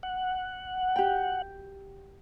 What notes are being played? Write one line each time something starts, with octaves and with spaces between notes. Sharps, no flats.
F#5
G4 G5